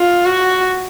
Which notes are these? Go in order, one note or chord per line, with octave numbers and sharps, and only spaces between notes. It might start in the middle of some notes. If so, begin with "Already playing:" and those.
Already playing: F4
F#4